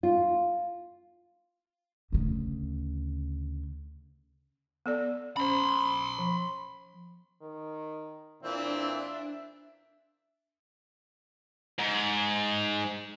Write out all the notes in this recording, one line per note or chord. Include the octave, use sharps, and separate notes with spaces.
F4
D2 C#3
B3 A4 D5
C#4 C5 B5 C6
F3
D#3
A#2 E3 C4 D4 E5
G#2